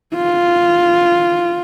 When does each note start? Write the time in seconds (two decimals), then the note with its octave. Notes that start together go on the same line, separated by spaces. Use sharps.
0.15 F4